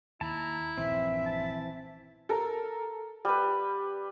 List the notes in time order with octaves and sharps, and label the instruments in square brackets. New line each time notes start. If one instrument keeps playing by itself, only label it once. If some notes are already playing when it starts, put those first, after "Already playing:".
[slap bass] D#2 [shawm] E4 [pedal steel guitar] A5 A#5
[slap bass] A#1 G2 D#3 [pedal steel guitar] E3 C4 [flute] E5
[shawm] A5
[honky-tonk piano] A4 A#4
[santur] G3 B4